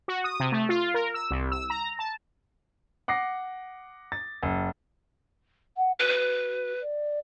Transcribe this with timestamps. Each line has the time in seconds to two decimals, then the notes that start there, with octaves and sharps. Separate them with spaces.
0.08 F#4
0.24 D#6
0.40 C3
0.52 A3
0.69 F4
0.94 A#4
1.14 E6
1.31 C2
1.52 E6
1.70 A#5
1.99 A5
3.08 F#5 D6 A#6 C7
4.12 A6
4.43 F#1
5.77 F#5
6.00 F#4 B4
6.81 D5